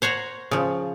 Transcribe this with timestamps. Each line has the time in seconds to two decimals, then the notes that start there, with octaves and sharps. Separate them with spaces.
0.02 C5 C#5 F#5 A#5
0.51 C#3 F3